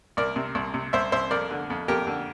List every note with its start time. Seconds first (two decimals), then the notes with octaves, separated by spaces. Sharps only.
0.17 C2 A#4 D5
0.36 C3
0.55 C2
0.74 C3
0.93 C2 C5 E5
1.12 C2 C5 E5
1.31 F2 A#4 D5
1.51 D3
1.70 F2
1.88 F2 G4 A#4
2.07 D3